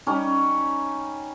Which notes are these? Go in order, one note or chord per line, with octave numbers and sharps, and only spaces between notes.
G3 C#4 D#4